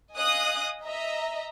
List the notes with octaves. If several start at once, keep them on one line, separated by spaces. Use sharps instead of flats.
D#5 F5 G#5 D#6 F#6
D#5 E5 A#5